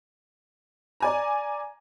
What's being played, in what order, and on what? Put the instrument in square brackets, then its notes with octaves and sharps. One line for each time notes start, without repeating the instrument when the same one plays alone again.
[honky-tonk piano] D5 G#5 A#5